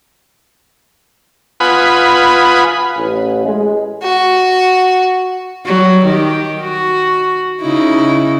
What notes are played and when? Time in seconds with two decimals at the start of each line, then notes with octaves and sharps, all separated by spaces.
1.60 F4 B4 F#5 G#5 B5 D#6
2.97 A1
3.45 G#3
4.03 F#4
5.66 F#3 G3
6.06 D#3 G4
6.60 F#4
7.61 C#3 D#4 E4